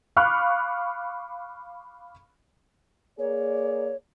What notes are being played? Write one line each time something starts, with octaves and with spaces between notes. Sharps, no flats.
F5 B5 C#6 D6 F6 F#6
A#3 G#4 C#5 D5